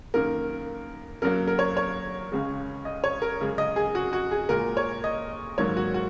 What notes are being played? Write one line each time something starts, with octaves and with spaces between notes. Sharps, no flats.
F#2 D#3 A#3 A#4
F#2 F#3 A#3 A#4
A#4
C#5
C#5
C#2 C#3 G#3
D#5
C#5
A#4
F#2 C#3 G#3
D#5
G#4
F#4
F#4
G#4
A#2 G#3 A#4
C#5
D#5
G#2 D#3 F#3 A#3 C#5
F#4
F#4